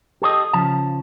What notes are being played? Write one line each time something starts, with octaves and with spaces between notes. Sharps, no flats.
G4 A4 C#5 D#5
C#3 F3 A5